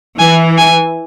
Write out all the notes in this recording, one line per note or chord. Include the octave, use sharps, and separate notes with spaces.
E3 G#5
G#5